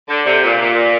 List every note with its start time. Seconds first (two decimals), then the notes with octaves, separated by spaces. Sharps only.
0.09 D3
0.25 C3
0.43 A#2
0.61 A#2